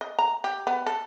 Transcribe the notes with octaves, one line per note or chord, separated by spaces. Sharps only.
D#5
A#5
G4
B3
A4